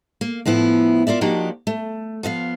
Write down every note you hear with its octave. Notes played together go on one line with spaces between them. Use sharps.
A#3
A2 F3 B3 E4
F4 A#4 D5 E5
F3 A#3 D4 D#4 F#4 G4
A3
F3 B3 E5 F5